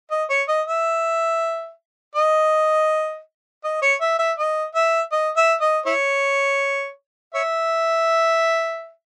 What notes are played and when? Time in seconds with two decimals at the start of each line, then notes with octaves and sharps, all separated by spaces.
0.11 D#5
0.30 C#5
0.48 D#5
0.66 E5
2.15 D#5
3.64 D#5
3.82 C#5
4.01 E5
4.19 E5
4.38 D#5
4.75 E5
5.12 D#5
5.36 E5
5.61 D#5
5.86 E4 C#5
7.34 C#5 E5